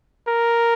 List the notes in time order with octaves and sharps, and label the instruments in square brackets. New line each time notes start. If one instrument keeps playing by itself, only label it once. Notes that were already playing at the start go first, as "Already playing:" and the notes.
[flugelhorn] A#4